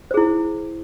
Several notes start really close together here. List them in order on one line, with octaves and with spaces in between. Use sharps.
C5 G#4 E4